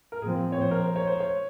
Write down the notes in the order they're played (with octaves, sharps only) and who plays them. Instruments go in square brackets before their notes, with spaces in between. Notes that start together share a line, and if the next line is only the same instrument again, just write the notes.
[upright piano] A#4
[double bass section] A#2 F3 C4 [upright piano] G#4
[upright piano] C#5
C5
A#4
C5
C#5
C5
C#5